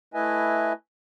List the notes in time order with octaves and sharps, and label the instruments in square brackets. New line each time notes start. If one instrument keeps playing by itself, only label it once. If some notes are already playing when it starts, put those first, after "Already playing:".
[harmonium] A3 E4 B4 D#5 E5 G#5